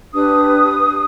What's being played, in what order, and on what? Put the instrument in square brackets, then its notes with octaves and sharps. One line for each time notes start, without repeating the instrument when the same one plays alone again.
[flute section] D4 G4 B4 D#6